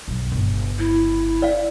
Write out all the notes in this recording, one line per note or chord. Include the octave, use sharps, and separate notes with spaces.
B1 F#2
G1 C#3
E4
D5 F5